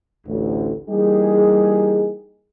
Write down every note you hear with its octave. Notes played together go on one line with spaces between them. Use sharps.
A1 D2
E3 G3 A#3 D#4 G4 G#4